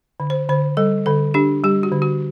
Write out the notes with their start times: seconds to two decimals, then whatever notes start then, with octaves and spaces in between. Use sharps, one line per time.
0.20 D3
0.30 C5
0.49 D3 C5
0.77 G3 A4
1.06 D3 A4
1.34 D4 G4
1.64 G3 G4
1.83 F#4
1.92 D3
2.02 F#4